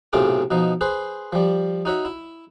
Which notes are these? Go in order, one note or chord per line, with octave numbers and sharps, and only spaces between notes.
B1 A2 C3 F4 G#4 D6
B2 F3 D#4
G#4 B4 C5
F3 G3
D#4 F#4 C#5 E5
E4